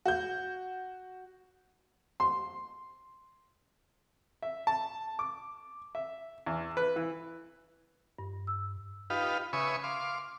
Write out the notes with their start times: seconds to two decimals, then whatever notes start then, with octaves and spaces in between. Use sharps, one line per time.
0.06 F#4 G6
2.20 C6
4.42 E5
4.67 A5
5.19 D6
5.95 E5
6.46 E2
6.77 B4
6.96 E3
8.19 G2
8.47 E6
9.10 D#4 F4 G4 B4 F5
9.53 C#3 B4 E5 G#5 C#6 D#6
9.84 F5 C6 D6